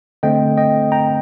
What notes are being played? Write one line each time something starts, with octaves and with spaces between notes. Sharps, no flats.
D3 A3 C4 D#5 G5
D#5 G5
G5 A#5